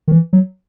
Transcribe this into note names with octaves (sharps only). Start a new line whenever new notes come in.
D#3
E3
F#3